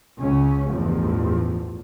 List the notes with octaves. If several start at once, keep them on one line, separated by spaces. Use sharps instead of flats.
C#2 C#3 C#4
A1 E2 G2 F3